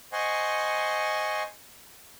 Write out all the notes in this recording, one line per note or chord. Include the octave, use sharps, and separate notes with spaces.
C5 D#5 F#5 G#5 C6 C#6